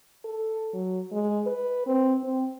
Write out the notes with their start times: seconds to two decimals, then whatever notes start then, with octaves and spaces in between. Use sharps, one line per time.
0.25 A4
0.74 F#3
1.12 G#3
1.46 B4
1.87 C4
2.23 C4